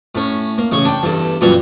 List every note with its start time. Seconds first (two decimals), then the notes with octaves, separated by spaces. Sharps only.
0.15 A2 C#4
0.58 A#3
0.72 A1 C#3 C#6
0.85 D4 G5
1.03 E2 G2 A4
1.41 F#2 A#2 E3 G3 C#6